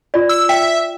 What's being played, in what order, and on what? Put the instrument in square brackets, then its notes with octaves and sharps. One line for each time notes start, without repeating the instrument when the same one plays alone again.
[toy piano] F4 D5
[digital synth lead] E6
[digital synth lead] E5 [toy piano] G5